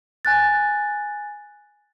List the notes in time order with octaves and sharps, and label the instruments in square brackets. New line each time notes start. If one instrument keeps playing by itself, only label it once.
[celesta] G#5 F#6 A6